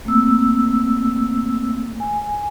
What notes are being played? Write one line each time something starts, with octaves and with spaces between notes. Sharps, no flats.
A3 A#3 C4 E6
G#5